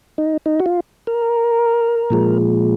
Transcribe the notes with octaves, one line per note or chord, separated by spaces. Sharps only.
D#4
D#4
F#4
F4
A#4
A#2 F3 G#3